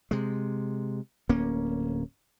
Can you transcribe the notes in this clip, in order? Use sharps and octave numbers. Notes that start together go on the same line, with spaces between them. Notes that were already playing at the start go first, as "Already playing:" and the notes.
C3 G#3
D1 A#3 C#4